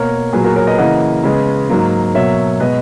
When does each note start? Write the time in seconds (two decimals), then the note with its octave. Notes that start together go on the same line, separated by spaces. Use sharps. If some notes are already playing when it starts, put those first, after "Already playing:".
Already playing: B2 A#3 A#4 C#5
0.33 A#2 F#3 B3 G#4 B4
0.44 F#4 A#4
0.56 A#4 C#5
0.67 B4 D#5
0.78 C#3 E3 A#3 D#5 F#5
1.24 C#3 G#3 B3
1.70 G#2 F#3 A#3
2.15 B2 F#3 A#3 C#5 E5
2.60 B2 G#3 B3 B4 D#5